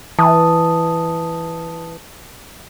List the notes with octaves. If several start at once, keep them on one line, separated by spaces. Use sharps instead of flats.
E3 A5 D#6